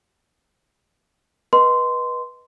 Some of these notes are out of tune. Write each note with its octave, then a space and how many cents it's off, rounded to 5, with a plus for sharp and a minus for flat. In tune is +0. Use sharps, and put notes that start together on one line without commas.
B4 -20 D#5 +0 C6 -15